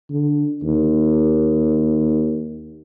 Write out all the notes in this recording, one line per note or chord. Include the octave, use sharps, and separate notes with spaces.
D3
D#2